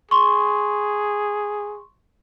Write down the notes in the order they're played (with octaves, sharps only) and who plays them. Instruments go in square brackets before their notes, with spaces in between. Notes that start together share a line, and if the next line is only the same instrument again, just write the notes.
[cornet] G#4 [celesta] C6 C#6